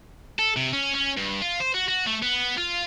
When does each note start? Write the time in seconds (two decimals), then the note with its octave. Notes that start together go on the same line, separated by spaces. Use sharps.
0.39 A4
0.57 C3
0.73 C#4
0.95 C#4
1.17 G2
1.42 F4
1.60 C5
1.74 F#4
1.88 F#4
2.06 A3
2.22 B3
2.57 F4